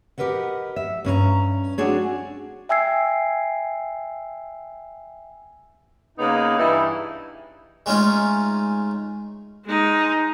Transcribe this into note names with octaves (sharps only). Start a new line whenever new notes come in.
G4 A#4 B4 D#5 F#5
E5
G2 C#4 A#4 A#5
C4 D4 F#4 G#4 C#5
E5 G5 G#5 E6 G#6 C7
C#3 A#3 B3 D#4
G2 E3 D#4 E4
G#3 A3 C#4 D#4 F4
G#3 D#4